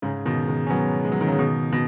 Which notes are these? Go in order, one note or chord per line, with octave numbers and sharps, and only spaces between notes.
G#2 C#3
B2 D#3
D#3 G#3
C#4
F#3 B3
G#3
F#3
D#3
C#3 F#3
B2 D#3
B2